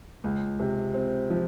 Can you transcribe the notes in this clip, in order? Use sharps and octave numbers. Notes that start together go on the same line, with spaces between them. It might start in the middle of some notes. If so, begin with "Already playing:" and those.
C#2
C3
C4
F3